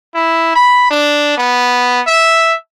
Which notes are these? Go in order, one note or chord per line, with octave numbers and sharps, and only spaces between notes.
E4
B5
D4
B3
E5